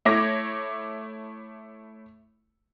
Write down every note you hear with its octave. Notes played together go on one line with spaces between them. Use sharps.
A3 E4 C#5 D6 A#6